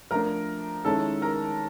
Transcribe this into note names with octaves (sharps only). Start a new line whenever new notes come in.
F3 A3 D4 A#4 A#5
D#3 G#3 C#4 E4 A4 A5
A#4 A#5